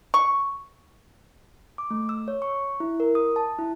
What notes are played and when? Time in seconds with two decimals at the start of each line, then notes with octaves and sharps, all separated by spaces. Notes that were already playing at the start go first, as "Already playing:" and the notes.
0.14 C#6
1.78 D6
1.91 A3
2.09 E6
2.28 C#5
2.42 C#6
2.80 E4
3.00 A#4
3.15 D#6
3.36 A5
3.58 E4